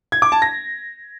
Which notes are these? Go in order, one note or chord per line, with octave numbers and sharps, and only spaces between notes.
G#6
D6
A5
A#6